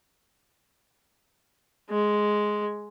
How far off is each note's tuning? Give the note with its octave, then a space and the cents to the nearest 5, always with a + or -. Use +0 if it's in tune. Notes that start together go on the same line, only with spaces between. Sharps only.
G#3 +5